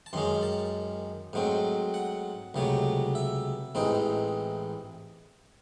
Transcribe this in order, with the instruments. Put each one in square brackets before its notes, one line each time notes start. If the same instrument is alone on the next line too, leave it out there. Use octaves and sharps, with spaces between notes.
[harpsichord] A5
F#2 D#3 G#3 C#4 C6
A5
G#2 F#3 A3 C4
F#5
C#2 C3 F#3 A3
E5
A1 G#2 E3 C4 D#4